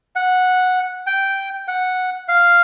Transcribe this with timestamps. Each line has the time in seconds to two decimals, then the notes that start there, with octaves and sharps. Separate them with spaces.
0.16 F#5
1.07 G5
1.68 F#5
2.28 F5